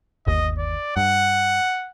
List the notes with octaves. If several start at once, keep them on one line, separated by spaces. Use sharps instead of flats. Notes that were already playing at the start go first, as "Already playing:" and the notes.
G1 D#2 D#5
D5
G2 F#5